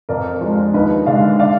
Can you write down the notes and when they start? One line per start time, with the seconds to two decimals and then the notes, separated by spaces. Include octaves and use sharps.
0.09 F2 A#4 D5
0.41 F3 G#3 D4
0.74 D#2 B4 D#5
1.06 D3 G#3 D4 D5 F5
1.39 D5 F5